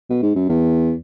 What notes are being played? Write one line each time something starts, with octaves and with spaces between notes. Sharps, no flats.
B2
G#2
F#2
E2